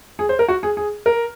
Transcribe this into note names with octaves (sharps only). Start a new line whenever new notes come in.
G#4
C5
A#4
F#4
G#4
G#4
A#4